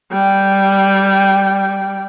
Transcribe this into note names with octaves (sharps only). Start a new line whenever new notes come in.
G3 G5